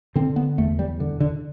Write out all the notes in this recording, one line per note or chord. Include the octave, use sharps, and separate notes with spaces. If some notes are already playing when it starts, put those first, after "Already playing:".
D3 C4
B3
E2 A3
G3
D3
D3